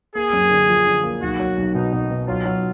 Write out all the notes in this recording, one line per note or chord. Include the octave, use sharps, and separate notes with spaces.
A#3 G#4
F#2
D3
F3
D3
A#3
B1 F#4
F#3
B1
B2 D#4
B2
B2
F#3 F4
F#3